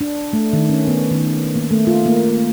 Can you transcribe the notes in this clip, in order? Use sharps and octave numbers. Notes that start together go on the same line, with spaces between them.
D4
A3
D#3
C#4
B3
D#3
A#3
A3
F4
A#3